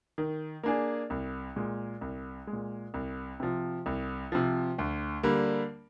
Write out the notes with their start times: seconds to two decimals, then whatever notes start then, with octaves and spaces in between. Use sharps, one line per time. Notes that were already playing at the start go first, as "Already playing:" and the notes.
0.18 D#3
0.63 A#3 D4 G#4
1.10 C2
1.56 A#2 G#3
2.01 C2
2.47 G#3
2.53 A#2
2.94 C2
3.40 C3 F3
3.86 C2
4.32 C3 F3
4.78 D2
5.23 D3 G3 A#3